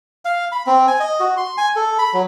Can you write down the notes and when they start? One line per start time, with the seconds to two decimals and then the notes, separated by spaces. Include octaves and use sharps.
0.25 F5
0.52 B5
0.66 C4
0.87 G#5
1.00 D#5
1.20 F#4
1.37 C6
1.58 G#5
1.76 A4
1.98 B5
2.13 F#3